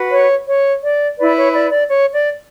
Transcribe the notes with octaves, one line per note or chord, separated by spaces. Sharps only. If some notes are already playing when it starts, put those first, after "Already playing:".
Already playing: F#4 B4
C#5
C#5
D5
E4 B4 D5
C#5
D5
D5
C#5
D5